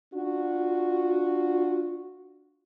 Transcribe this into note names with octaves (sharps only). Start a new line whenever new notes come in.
D4 F4 F#4